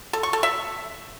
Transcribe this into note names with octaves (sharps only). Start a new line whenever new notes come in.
A4
C#6
A4
E5